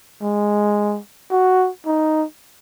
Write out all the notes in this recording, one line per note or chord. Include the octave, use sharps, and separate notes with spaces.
G#3
F#4
D#4